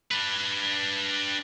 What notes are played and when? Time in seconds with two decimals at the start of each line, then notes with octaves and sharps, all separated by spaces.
0.11 D4 B4